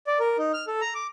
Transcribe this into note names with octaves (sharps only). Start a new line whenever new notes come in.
D5
A#4
D#4
F6
A4
A#5
D6